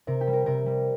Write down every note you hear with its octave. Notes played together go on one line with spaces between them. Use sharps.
C3 A#4
G4
G3
A#4
C3 A#4
G3